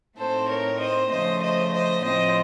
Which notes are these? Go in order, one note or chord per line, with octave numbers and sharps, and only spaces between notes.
A2 A3 C4 D#4 A4 C5
A#4 C#5
C5 D#5
C#3 F3 A3 C5 D#5
C5 D#5
C5 D#5
A2 F3 C4 F4 C5 D#5